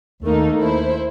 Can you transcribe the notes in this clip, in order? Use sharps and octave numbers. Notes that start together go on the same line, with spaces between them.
D#2 A3 A#3 D#4
E4 C5